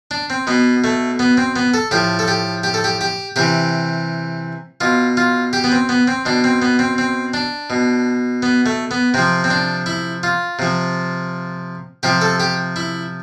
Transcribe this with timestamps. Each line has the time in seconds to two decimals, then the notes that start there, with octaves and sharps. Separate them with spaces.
0.11 D4
0.30 C4
0.47 B2 B3
0.84 A3
1.19 B3
1.37 C4
1.56 B3
1.74 A4
1.91 A2 F3 G4
2.19 A4
2.28 G4
2.64 G4
2.74 A4
2.84 G4
3.01 G4
3.36 C3 E3 G4
4.81 B2 F4
5.17 F4
5.53 G4
5.64 B3
5.72 C4
5.89 B3
6.08 C4
6.25 B2 D4
6.44 C4
6.62 B3
6.79 C4
6.98 C4
7.34 D4
7.70 B2
8.42 B3
8.66 A3
8.91 B3
9.14 C3 F3 C4
9.44 C4
9.50 D4
9.86 E4
10.23 F4
10.59 C3 F3
12.03 C3 F3 G4
12.21 A4
12.40 G4
12.76 E4